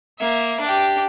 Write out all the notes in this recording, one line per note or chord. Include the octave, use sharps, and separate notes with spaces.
A#3 E5
D4 G4